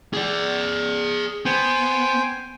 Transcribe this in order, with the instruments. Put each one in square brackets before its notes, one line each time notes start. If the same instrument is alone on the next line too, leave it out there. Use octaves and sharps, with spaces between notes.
[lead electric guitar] G#4 D5
[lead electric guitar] B3 [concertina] C5 G5 G#5